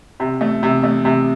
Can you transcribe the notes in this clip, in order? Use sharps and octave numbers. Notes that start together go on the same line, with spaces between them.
C3
A3
C3
A3
C3